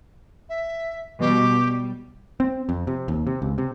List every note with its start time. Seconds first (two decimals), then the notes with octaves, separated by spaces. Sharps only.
0.49 E5
1.21 B2 G3 G4
1.60 G3
2.40 C4
2.69 F2
2.87 C3
3.08 D#2
3.27 C3
3.42 C#2
3.58 C3